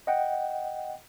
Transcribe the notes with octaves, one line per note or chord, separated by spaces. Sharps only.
D#5 F#5 G5